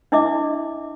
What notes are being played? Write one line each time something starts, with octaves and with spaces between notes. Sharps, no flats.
D4 E4 D#5 E5 D6